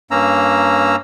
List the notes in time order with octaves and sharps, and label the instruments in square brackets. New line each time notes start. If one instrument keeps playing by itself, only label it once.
[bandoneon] G2 A#3 C#4 A#5 E6